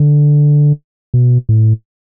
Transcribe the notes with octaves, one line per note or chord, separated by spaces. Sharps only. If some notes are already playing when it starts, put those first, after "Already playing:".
Already playing: D3
B2
A2